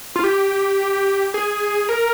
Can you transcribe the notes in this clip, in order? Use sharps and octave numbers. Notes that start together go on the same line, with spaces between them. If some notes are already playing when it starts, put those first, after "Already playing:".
F4
G4
G#4
A#4